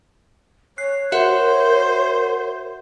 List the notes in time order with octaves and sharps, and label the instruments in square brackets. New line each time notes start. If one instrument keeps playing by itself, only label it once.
[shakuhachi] C#5 [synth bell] F#6 C7
[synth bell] F#4 E5 F#5 [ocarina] A#4 [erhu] C5